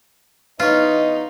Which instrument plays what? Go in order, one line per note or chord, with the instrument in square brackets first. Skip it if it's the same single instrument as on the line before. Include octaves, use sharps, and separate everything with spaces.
[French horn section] E2 B3 D#5 [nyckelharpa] D#4 [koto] F4 [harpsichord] B4 C#5